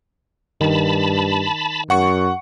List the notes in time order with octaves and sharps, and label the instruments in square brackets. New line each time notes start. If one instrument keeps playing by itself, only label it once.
[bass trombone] G2 [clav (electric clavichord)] D#3 [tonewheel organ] A5 B5
[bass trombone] F#2 [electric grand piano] F#5 C#6 C#7